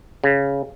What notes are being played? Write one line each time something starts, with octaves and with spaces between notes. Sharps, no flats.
C#3